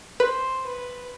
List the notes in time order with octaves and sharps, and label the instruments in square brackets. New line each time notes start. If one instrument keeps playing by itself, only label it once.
[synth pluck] B4 [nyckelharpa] C5
[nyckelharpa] B4